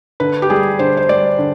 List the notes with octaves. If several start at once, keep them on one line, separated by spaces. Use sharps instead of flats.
D3 B4
G4
G3 G#4
D3 C5
C5
G3 D5
D3